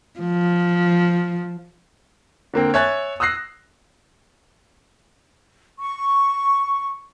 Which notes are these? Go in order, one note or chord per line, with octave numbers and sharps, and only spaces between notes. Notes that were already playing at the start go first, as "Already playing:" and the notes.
F3
D3 A#3 C4
C#5 E5 G#5 F#6 G#6 A6
D#6 E6 F#6 A#6 C7
C#6